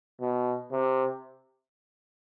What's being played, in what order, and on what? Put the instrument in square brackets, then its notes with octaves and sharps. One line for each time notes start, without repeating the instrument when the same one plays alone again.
[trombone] B2
C3